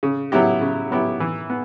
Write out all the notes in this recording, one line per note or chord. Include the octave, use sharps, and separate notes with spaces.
C#3
F#3 B3 E4 G4
C#3
F#3 B3 E4 G4
E3
B3